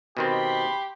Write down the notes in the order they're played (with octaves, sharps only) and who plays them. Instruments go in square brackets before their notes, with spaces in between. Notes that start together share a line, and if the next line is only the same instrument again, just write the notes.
[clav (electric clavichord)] B2 D#3 C4 [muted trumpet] G4 [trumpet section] B5 C6